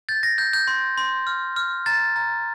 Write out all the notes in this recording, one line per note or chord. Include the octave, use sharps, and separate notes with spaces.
G6 A6
A#6
G6
G6
C6
C6
F6
F6
A#5 A6
A#5